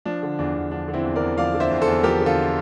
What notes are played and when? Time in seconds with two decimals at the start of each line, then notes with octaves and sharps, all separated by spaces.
0.05 F3 D4
0.23 D3
0.39 E2 D4
0.55 E2
0.71 F3 D4
0.88 D3
0.94 C4 E4
1.05 E2
1.16 A#4 D5
1.22 E2
1.38 F3 D5 F5
1.54 D3
1.60 C5 E5
1.71 E2
1.82 A4 C5
1.88 E2
2.03 F3 G4 A#4
2.21 D3
2.26 F4 A4